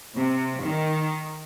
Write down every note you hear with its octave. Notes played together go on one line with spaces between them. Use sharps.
C3
D#3